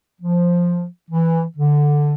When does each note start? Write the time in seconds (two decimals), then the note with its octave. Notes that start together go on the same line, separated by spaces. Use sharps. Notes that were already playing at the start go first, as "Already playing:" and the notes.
0.21 F3
1.10 E3
1.56 D3